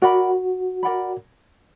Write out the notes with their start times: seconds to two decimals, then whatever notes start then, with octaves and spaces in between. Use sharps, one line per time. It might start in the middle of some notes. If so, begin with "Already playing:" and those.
0.02 F#4 A#4 D5 F#5 B5
0.83 A#4 D5 F#5 B5